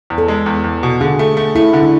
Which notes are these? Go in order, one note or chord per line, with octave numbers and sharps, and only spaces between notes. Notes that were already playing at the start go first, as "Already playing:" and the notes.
E2
A4
G#3
E2
E2
B2
D3 G#4
A3
A3
A3 E4
D3
D4